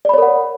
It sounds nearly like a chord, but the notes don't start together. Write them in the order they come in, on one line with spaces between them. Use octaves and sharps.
D5 B5 C#5 A#4 F#5